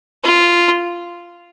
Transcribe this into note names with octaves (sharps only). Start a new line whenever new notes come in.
F4